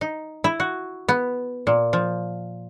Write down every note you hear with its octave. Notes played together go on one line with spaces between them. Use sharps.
D#4
E4
F#4
B3
A#2
F3